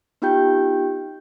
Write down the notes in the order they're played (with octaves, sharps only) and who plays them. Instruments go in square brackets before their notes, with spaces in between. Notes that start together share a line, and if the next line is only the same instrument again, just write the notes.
[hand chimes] B3 D#4 F4 G4 G5 G6